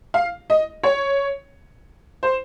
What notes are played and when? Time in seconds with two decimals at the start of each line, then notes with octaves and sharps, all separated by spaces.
0.14 F5
0.50 D#5
0.83 C#5
2.23 C5